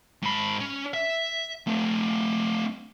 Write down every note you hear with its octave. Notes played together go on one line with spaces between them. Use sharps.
G#2 B5
C#4
E5
A3 C4